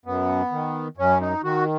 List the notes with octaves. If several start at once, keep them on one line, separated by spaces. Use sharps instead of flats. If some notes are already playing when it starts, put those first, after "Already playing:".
F#2 B3
D#3
F#2 C#4
D#4
D#3 F#4